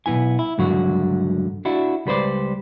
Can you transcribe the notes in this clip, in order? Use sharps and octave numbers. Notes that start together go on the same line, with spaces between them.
B1 C3 B3 E4 G#5
E4
C#2 G2 D3 F#3 F#4
D4 E4 F#4
C#2 G3 B4 C5 D5